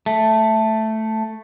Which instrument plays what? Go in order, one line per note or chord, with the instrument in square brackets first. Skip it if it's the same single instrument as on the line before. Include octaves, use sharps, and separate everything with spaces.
[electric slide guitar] A3